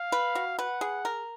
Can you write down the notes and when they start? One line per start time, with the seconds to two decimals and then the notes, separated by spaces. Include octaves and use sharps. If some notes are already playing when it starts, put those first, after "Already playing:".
Already playing: F5
0.12 B4
0.35 F#4
0.59 B4 F#5
0.81 G#4
1.05 A#4